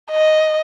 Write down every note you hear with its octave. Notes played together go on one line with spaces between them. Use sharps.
D#5